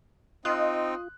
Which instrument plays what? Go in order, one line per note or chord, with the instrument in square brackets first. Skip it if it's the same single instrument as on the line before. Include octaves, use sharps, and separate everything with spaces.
[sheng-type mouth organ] C4 D#4 [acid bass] F4 [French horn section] D#5 [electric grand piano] C6 D#6 F#6